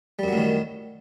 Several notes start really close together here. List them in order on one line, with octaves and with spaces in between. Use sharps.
G3 F#2 F#3 A2 D#3